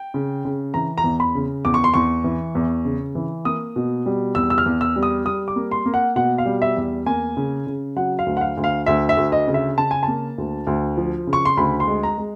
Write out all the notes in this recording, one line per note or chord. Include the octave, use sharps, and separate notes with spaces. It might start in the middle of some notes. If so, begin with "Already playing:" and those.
Already playing: G5
C#3
C#3
E3 A#5
A#5
E2
B5
C#3
E2 D6
C#6
C6
E2 C#6
E3
E2
C#3
E3
A#3 D#6
B2
G3
E2 E6
E6
F6
E2
E6
G3
D#6
G3 D#6
D6
A#3
C6
A#3
F#5
B2 F#5
F5
G3
E5
E2
A#3 G#5
C#3
C#3
F#3 F#5
F5
D2
F#5
F5
D2
F5
D2 E5
E5
D2
D#5
C#3
E5
C#3 A5
G#5
A5
A#3
D2
D2
F3
C#3
C#6
C6
D2 B5
C6
G#3
A#5
G#3